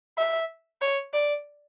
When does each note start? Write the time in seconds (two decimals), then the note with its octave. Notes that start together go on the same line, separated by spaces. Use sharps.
0.18 E5
0.82 C#5
1.13 D5